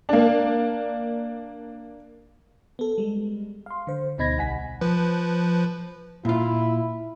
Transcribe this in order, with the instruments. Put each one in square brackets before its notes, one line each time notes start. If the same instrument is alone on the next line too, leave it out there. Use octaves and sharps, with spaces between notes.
[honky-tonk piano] A#3 D4
[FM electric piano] B3 A4
G3 G#3
F5 C6
D3 C5
D2 B2 D#4 B5 G#6 A#6
B1 G3 F#5 G#5 B6
[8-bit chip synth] F3 B4
[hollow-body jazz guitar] A#2 F4 [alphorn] E4